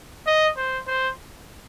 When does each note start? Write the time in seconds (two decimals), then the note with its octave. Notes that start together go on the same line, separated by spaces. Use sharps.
0.26 D#5
0.57 C5
0.87 C5